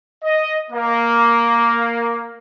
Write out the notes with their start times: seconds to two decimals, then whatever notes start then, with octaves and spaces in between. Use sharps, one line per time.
0.24 D#5
0.71 A#3